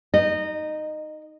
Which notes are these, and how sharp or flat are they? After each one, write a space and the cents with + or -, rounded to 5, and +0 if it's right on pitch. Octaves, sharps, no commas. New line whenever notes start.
D#4 +0 D#5 -20